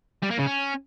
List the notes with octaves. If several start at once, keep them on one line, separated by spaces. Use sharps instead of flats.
G3
A#3
C#3
C#4